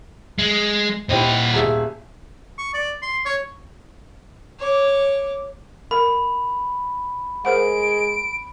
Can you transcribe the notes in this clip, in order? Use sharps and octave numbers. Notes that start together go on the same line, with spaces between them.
G#3
A#2 E4 G4 C5 D#5
D#1 G#4 E5
C#6
D5
C6
C#5
C#5 D6
A#4 B5
G#3 A#4 C5 F#5 D7